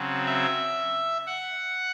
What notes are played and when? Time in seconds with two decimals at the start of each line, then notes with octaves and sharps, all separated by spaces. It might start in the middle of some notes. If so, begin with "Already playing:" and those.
Already playing: C#3 F#3 C4
0.26 E5
1.27 F#5